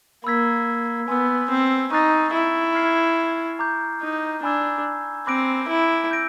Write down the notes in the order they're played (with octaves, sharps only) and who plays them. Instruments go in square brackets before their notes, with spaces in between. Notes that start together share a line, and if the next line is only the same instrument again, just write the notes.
[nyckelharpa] A#3 [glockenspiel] B5 E6 G#6 B6
[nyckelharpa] B3 [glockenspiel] G#5 C6 E6
[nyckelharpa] C4
[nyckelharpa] D#4 [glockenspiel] C#6 F#6 A6 C7
[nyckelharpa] E4
[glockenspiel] F6 G#6 C7
A#5 D6 G6
[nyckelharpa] D#4
[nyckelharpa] D4 [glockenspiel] G#5 B5 E6 G#6
[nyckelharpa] C4 [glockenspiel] B5 D6 F#6 A#6 D7
[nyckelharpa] E4
[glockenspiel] E6 G6 A#6 D7